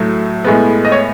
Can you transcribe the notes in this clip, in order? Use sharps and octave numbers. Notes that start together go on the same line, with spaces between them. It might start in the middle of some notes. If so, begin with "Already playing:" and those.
Already playing: A2 F#3 A3
A2 G#3 B3
D#5
C#5